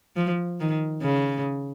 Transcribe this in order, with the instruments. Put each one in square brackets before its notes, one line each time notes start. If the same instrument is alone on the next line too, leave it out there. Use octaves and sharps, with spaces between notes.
[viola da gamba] F3
D#3
C#3